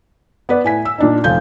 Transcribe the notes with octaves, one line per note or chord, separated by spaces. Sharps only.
B3 B4 D5
A2 G#5 B6
E6
A#2 D4 D#4
F1 F4 G6